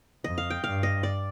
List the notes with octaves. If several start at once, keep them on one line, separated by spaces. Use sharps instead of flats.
F2 D#5
F5
G5
G2 F5
D#5
D5